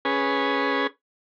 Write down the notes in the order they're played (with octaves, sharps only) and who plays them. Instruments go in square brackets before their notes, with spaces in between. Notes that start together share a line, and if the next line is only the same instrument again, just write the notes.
[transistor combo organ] C#4 G#4 B4